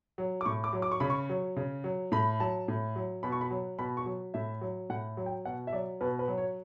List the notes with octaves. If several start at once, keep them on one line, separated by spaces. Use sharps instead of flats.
F#3
D6
A2 C#6
D6
F#3
D6
C#6
C#3 B5
C#6
F#3
C#3
F#3
A2 B5
F#3 A5
A2
F#3
B2 B5
C#6
B5
F#3
B2 B5
C#6
F#3
A2 E5
F#3
A2 F#5
F#3
G5
B2 F#5
E5
F#3 D5
B2 B4
B4
F#3
C#5